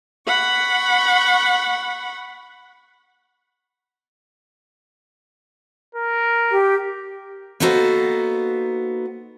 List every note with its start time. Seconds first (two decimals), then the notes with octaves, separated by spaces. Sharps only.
0.27 F#5 B5 C#6
5.95 A#4
6.50 G4
7.60 A#3 B3 D#4 F#4 A4 C5